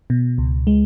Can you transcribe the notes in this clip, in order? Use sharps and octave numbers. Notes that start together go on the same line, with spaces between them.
B2
C#2
G#3